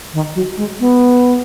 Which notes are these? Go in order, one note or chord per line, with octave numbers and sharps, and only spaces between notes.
D#3
F#3
G#3
B3